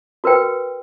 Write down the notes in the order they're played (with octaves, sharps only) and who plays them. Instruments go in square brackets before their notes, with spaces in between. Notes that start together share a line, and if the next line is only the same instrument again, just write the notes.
[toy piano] F#4 A#4 B4 G5